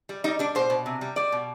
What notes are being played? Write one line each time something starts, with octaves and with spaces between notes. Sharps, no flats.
G3
G3 D#4
G3 D4
B2 C5
B2
C3
G3
G3 D5
B2